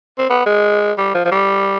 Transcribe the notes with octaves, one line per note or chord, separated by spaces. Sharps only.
C4
B3
G#3
G3
F3
F3
G3